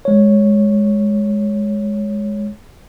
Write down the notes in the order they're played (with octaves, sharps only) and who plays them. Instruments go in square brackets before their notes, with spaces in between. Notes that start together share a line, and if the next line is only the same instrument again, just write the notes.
[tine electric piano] G#3 C#5